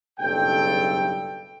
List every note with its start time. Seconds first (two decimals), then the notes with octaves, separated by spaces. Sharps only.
0.20 F#1 B1 G2 A4 G5